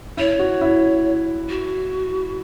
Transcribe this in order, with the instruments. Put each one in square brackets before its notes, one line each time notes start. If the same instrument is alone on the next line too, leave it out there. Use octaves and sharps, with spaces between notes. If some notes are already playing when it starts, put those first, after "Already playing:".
[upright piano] E4 [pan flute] C#5
[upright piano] F#4
E4
[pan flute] F#4